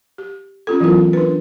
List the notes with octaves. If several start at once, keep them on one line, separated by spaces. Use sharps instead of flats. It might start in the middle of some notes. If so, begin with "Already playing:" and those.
G4
C4 C#4 F4 G4 A4
E3 F#3 B3 E4 F4 A#4
D4 F4 A#4 B4